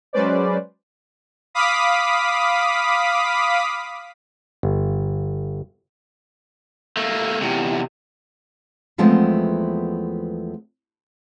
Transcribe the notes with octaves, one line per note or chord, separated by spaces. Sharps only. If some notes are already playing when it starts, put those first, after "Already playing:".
F#3 G#3 C#4 B4 C5 D5
F5 B5 D6 D#6 B6
G1
A3 A#3
E2 C3
E2 F3 G#3 A3 B3 C4